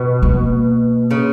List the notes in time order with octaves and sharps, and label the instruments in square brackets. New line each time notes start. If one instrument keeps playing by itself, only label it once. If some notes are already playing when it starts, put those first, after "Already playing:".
Already playing: [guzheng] B2
[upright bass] A#3
[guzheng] C#3